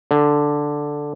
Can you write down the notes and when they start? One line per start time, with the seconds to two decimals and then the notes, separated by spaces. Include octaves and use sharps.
0.11 D3